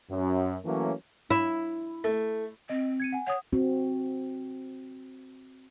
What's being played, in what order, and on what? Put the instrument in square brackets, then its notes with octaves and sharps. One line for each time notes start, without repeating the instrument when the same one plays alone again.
[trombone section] F#2
E3 F#3 A3 A#3 C#4
[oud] E4
[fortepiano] A3
[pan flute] C4 [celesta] D#5
[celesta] G#6 C#7 D#7
F#5 G#5
[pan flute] C#5 [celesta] F#5 D#6
[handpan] C4 F#4